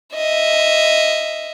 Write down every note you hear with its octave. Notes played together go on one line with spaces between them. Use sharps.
D#5 E5